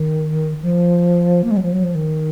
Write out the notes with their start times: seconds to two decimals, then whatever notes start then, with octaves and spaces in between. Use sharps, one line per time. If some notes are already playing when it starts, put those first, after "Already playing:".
Already playing: D#3
0.62 F3
1.44 A#3
1.51 G#3
1.57 F#3
1.63 F3
1.73 F#3
1.84 F3
1.95 D#3